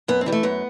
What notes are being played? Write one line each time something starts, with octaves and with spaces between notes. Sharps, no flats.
F#2 B3
C4
E3 G3
A3
F#2 B3